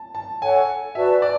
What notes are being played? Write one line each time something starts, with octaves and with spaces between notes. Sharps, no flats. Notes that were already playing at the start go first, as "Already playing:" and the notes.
Already playing: A5
A5
A4 C#5 F#5 G#5
F#4 B4 D5 E5 A5
D5